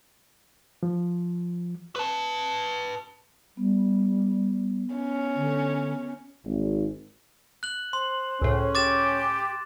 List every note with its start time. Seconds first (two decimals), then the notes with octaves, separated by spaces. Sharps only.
0.83 F3
1.96 B4 A5
3.57 G3 B3
4.95 C#4
5.36 D3
6.45 G#1
7.63 F#6 F#7
7.93 C5 C6
8.42 C#2 A2 C#4
8.75 G4 D6 A6 E7